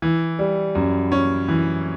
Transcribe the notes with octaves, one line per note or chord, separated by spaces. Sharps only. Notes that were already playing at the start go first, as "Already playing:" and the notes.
E3
G3
F#2
C#4
E3